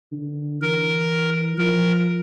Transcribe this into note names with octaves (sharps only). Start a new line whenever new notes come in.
D3
E3 A#4
F3 A#4